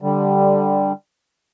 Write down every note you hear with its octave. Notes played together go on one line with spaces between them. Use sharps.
D3 G3